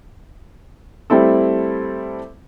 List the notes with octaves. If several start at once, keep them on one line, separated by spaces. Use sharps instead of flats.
G3 A3 C4 E4 A4